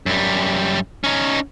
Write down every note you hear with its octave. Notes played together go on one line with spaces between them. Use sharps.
F#2 G3
C#4 D#4